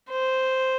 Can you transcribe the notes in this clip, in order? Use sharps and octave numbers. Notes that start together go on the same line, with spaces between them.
C5